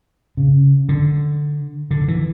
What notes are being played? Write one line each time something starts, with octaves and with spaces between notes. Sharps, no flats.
C#3
D3
D3
E3